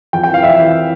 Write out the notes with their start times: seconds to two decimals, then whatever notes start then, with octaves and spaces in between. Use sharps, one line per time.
0.13 F2 G5
0.23 G5
0.29 E3
0.34 F5
0.43 F2 E5
0.58 E3